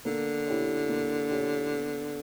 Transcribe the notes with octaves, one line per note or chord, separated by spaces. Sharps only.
D3 A#3
E4 G4 C#5
A#3
E4 G4 C#5
B3